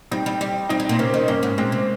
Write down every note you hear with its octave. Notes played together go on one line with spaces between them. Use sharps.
G3 C4 D#4
G3
G3
G3 C4 D#4
G3
A#2
C3 A#3 C#4
D#3
G2 A#3 C#4
G#2
A#2 G#3 C4
C3